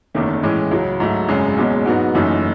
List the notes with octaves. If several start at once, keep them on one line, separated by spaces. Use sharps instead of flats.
F#1 E2 D#3 A3 C#4
A2 E3 G#3 C#4
C#2 C#3 F#3
G#2 F#3 A3
G#1 F#2 C#3 G#3
F#1 E2 B2 G#3 C#4
G#2 F#3 B3 D#4 F#4
F#1 F#2 E3 A3 D#4